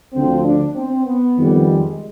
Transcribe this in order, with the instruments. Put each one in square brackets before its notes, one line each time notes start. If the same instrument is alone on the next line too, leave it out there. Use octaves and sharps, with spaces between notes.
[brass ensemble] D2 D3 F3 C4
D4
C4
B3
F2 D#3 G3
G#3